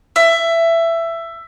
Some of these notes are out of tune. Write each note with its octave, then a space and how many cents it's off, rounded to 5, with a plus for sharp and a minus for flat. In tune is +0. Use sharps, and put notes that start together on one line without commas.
E5 +15